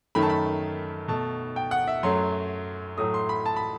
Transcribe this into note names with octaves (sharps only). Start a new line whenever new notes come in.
F#2 D#3 A3 B5
A5
B5
B2 A3 A5
G5
F#5
E5
F#2 F#3 A3 C6
A2 F#3 A3 D#6
C6
B5
A5
B5